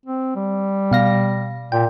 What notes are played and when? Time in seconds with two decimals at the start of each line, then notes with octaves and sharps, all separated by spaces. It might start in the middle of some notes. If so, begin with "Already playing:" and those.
0.05 C4
0.36 G3
0.91 B2 F5 A#6
1.72 A#2 G5